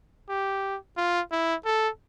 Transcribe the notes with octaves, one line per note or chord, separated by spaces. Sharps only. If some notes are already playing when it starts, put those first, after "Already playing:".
G4
F4
E4
A4